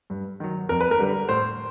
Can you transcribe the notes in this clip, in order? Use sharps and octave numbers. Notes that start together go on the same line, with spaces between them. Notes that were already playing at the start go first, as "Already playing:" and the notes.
G2
D#3 F#3
F2 A#4
B4
A#4
D3 G3
A2 C5